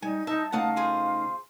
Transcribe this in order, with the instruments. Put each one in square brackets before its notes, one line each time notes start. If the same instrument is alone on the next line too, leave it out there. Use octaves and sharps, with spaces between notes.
[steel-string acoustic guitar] G3 [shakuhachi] D#4 [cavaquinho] G#5
[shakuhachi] D#4 [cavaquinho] E5 [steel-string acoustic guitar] A5
[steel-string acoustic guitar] C#3 A3 D#4 [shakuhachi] F5 [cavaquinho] F#5 A5 D#6
[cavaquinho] F4 G#4 C5